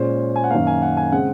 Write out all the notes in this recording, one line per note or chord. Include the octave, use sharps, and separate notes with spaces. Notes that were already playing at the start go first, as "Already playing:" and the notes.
Already playing: A#2 G#3 C#4 C5
G#5
F#5
F#2 D#3 A#3 F5
G#5
F#5
G#5
C#3 G#3 C4 F#5